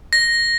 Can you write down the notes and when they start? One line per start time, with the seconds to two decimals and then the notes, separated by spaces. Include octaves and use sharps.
0.13 A#6